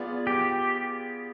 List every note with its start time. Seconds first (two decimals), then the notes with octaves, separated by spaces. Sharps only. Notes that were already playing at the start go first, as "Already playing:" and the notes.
Already playing: B3 F4 G#4 D5
0.27 G4